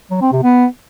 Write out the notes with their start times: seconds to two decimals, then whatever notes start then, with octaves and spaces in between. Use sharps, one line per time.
0.10 F#3
0.21 C4
0.32 C3
0.43 B3